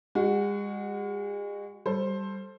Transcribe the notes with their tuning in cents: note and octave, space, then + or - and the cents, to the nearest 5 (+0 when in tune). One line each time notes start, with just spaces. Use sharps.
G#3 -40 F#4 +0
G3 +0 A4 +5 C5 +10